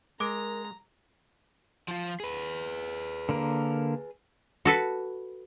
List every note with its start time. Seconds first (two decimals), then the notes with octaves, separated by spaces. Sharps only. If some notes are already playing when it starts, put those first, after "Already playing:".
0.20 G#3 A#4 A#5 D6 D7
1.88 F3 F4
2.20 G#4 B4
3.29 D3 A#3 A#4
4.65 F#4 A4 B4